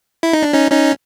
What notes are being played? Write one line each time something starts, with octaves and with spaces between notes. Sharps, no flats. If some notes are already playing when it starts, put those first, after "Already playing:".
E4
D#4
D4
C#4 D#4
C#4 D#4